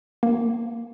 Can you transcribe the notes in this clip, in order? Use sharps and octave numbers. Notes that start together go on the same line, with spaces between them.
A#3